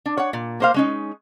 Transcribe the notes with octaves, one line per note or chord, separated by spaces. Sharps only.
D4
C#5 F#5
A#2
A#3 C5 F5
G#3 C#4 D#4